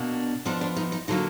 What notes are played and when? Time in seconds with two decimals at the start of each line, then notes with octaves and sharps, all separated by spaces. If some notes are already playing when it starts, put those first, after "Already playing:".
Already playing: B2 A#3 D4
0.45 F2 F3 B3 D4 D#4
0.61 D4
0.77 D#4
0.92 D#4
1.08 D3 F#3 A#3 D#4